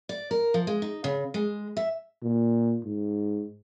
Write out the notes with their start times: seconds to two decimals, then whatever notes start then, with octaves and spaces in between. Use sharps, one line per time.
0.09 D5
0.31 A#4
0.54 F3
0.67 G#3
0.82 D#4
1.04 C#3
1.34 G#3
1.77 E5
2.23 A#2
2.84 G#2